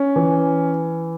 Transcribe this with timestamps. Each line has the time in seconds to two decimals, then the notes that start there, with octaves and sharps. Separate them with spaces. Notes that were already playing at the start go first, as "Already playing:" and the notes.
Already playing: C#4
0.16 E3